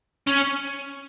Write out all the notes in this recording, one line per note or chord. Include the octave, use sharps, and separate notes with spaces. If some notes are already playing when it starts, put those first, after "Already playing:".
C#4